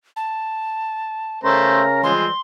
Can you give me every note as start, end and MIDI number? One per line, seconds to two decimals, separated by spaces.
0.16 1.39 81
1.44 2.12 49
1.44 1.83 57
1.44 2.12 61
1.44 2.00 70
1.44 1.83 72
1.44 1.83 76
1.44 2.00 82
2.03 2.27 52
2.03 2.27 53
2.03 2.27 55
2.03 2.27 56
2.03 2.27 60
2.03 2.41 84